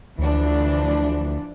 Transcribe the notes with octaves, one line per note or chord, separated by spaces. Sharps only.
D2 E3 F3 D4